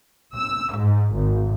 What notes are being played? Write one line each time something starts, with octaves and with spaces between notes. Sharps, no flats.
E6
G#2
G#1